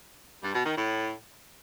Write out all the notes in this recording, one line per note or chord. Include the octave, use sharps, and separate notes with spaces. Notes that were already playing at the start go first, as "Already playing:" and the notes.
G2
B2
D#3
A2